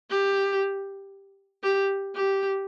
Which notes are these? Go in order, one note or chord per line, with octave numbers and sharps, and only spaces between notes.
G4
G4
G4